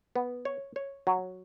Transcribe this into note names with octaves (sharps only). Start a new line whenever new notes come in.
B3
C#5
C#5
F#3